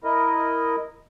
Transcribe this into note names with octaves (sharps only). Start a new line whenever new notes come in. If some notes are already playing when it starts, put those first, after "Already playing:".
E4 A#4 D#5